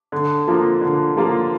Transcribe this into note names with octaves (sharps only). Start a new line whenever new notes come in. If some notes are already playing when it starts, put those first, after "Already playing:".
D3
F3 A#3 F4
D3
F3 A#3 F4